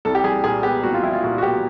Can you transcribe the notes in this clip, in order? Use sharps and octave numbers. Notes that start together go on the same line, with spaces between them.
C2 A4
G4
G3 G#4
A#2 G#4
B3 G4
C2 F#4
F4
G3 E4
F4
A#2 F#4
F#4
B3 G4